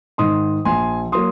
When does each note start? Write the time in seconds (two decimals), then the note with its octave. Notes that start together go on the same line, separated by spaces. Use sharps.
0.18 G#2 D#3 C6 D#6
0.65 A#1 G#5 C6
1.12 F#3 A#3 C6 D#6